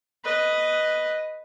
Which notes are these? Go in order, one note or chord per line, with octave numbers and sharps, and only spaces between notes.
B4 D#5